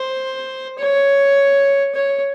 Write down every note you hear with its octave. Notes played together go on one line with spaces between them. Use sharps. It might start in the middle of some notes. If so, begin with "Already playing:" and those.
Already playing: C5
C#5
C#5